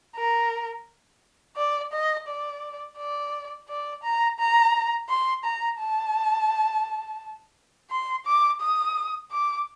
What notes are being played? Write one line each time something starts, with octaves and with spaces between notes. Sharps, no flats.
A#4
D5
D#5
D5
D5
D5
A#5
A#5
C6
A#5
A5
C6
D6
D#6
D6